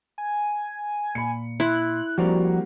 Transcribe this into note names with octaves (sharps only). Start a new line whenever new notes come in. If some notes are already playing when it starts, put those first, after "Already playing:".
G#5
A#2 B5 C#7
E4 C6 F#6
F3 G3 A#3 C4 F#4 D5 A#5